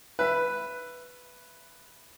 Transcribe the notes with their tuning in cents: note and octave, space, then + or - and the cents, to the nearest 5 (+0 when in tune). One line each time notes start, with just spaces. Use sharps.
B4 +0 E5 +20